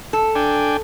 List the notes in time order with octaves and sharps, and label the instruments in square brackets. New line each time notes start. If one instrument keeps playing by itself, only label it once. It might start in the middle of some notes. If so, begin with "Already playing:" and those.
[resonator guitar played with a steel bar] A4
[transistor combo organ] D4 G5 G#5